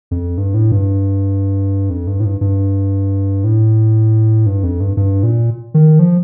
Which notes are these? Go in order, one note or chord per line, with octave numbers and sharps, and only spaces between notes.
F2
G2
A2
G2
F2
G2
A2
G2
G2
A2
G2
F2
G2
G2
A#2
D#3
F3